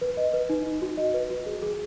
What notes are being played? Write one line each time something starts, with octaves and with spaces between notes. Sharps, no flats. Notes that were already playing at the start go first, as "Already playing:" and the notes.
B4
D#5
B4
D#4
D#4
F#4
D#5
B4
F#4
G#4
G#4